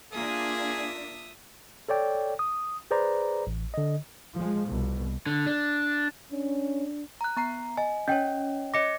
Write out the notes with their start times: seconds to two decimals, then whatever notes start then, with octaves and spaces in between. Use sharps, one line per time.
0.13 A#3 D4 F4 G#4 E5 D#6
1.89 A4 C#5 D5 G5
2.39 D#6
2.91 G#4 B4 C5 D5 A#5
3.47 A1
3.74 D3 D#5
4.34 F3 G#3
4.68 C2 B2
5.26 D3
5.46 D4
6.32 C#4 D4
7.21 A#5 F#6
7.37 B3 A#5 C7
7.77 D#5 G#5
8.08 C#4 C#5 D#5 G5
8.74 C#5 D#5 D6 A#6 C#7